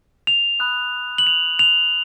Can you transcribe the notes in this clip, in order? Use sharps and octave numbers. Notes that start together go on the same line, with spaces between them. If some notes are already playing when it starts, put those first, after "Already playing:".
F7
B5 D#6 F#6
F#7
F7
F7